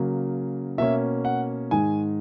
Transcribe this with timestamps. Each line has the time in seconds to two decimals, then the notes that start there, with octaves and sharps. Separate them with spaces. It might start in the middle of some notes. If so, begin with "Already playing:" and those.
Already playing: C#3 F#3 A#3
0.78 B2 A#3 C#4 E5
1.25 F#5
1.71 G#2 D#3 G#3 G#5